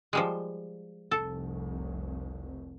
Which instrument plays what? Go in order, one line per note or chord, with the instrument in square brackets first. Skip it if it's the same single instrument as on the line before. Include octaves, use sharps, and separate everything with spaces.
[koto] F3 G3 G#3
[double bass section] F1 C2 [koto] A4